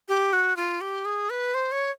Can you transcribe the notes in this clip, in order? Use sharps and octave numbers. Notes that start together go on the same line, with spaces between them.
G4
F#4
F4
G4
G#4
B4
C5
C#5